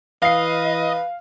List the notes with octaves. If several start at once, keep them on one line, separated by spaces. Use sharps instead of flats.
E3 B4 D#5 F5 C7